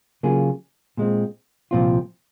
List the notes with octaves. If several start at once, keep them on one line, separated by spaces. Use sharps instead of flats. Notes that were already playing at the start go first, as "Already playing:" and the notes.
C#3 F#3 A#3 F4 G#4
A#2 G#3 C4
C2 A#2 F3 C4 F4